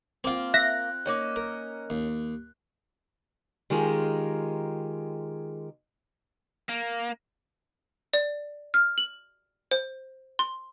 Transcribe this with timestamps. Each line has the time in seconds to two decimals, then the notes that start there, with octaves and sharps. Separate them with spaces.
0.24 A#3 C4 F4 F5
0.54 E5 F#6 A#6
1.06 A#3 C#4 D#4
1.36 A#4
1.90 D#2
3.70 D#3 G#3 F4 G4 G#4 A#4
6.69 A#3
8.13 D5
8.74 F6
8.98 F#7
9.71 C5
10.39 C6